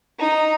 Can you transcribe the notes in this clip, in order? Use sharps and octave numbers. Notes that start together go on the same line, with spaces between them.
D#4